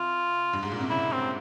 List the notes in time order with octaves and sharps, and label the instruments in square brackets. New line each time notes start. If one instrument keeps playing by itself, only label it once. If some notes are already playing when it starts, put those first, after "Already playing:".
Already playing: [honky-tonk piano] C3 [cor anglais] F4
[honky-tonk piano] G2
G#2
A#2
C3
[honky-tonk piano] C#3 [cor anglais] E4
[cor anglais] C4